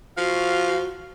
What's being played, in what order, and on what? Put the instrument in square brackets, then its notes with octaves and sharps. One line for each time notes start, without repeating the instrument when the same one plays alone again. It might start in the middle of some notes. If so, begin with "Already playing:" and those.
[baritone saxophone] F3 [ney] F#4 [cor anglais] F5